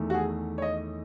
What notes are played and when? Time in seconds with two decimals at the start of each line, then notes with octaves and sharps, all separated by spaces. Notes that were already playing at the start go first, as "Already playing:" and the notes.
Already playing: E2 D#3 A3
0.10 F#4
0.14 G#4
0.58 C#5
0.62 D#5